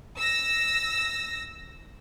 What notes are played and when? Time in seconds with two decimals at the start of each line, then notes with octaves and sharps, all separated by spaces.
0.19 E6 A#6